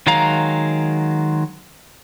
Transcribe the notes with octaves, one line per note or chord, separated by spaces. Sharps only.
D#3 F#3 G#3 F5 A#5